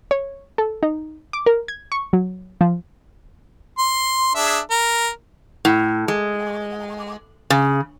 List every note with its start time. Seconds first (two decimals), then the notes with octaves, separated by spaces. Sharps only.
0.11 C#5
0.58 A4
0.83 D#4
1.33 D6
1.46 A#4
1.68 G#6
1.92 C#6
2.13 F#3
2.61 F3
3.78 C6
4.35 D4 G#4 E5
4.70 A#4
5.65 A2
6.08 G#3
7.50 C#3